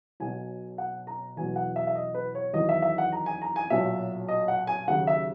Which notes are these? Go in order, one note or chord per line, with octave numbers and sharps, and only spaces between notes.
B1 B2 F#3 G#5
F#5
A#5
E2 B2 F#3 G#5
F#5
E5
E5
D#5
B4
C#5
E2 D#3 F#3 D#5
E5
E5
F#5
A#5
G#5
A#5
G#5
B1 A#2 F#3 E5
D#5
F#5
G#5
D#2 C#3 F#3 F#5
E5